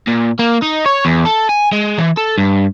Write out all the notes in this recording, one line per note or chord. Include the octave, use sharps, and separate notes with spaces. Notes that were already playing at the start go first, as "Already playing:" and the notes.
A#2
A#3
D#4
C#5
E2
A4
G#5
G#3
E3
A4
G2